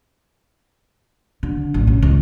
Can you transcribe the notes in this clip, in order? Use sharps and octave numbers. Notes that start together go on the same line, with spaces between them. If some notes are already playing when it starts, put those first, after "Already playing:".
D3
A1
C#3
C#2